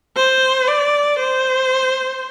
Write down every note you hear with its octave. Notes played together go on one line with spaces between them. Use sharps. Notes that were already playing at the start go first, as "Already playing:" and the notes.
C5
D5
C5